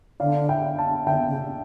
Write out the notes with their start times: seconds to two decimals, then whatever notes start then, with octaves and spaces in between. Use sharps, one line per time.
0.20 D3 D5 F5
0.49 E5 G5
0.78 F5 A5
1.07 D3 E5 G5
1.28 C#3